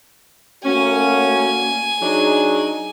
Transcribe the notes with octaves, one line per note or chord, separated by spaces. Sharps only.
A3 A#3 C#4 F#4 G#5
F#3 D4 D#4 G#4